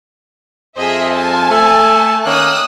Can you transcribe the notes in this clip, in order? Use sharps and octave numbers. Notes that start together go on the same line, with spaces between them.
F2 F3 G#4 C5 D#5 E5
G#5 A5
A3
D#3 A#3 C#4 D#6 E6 F#6